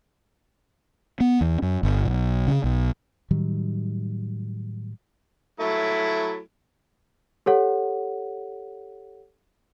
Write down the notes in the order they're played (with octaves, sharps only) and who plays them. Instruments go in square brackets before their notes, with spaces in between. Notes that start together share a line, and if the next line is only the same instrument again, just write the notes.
[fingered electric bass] B3
E2
F#2
G1
B1
C#3
B1
A2 D#3 F#3 G3
[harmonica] F#3 A3 E4
[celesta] G4 A4 C#5 F#5